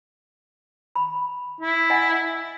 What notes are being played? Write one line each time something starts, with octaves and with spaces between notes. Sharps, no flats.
B5
E4
D#5 F#5 G#5